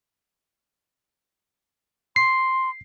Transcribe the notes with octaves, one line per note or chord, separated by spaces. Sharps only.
C6 C7